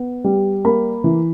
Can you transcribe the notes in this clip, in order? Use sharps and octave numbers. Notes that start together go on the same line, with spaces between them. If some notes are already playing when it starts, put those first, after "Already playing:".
Already playing: B3
G3
A#3 B5
E3